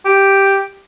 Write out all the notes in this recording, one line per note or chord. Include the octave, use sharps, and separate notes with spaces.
G4